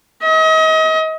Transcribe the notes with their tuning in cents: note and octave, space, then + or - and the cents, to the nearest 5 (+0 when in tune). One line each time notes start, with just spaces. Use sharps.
D#5 +35